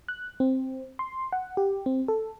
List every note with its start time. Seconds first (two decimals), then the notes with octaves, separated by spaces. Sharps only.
0.08 F#6
0.40 C4
0.99 C6
1.32 F#5
1.57 G4
1.86 C4
2.08 A4